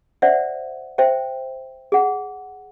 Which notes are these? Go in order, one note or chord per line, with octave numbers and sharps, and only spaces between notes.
C5 D5 E5 F#5
C5 E5 G5
G#4 F#5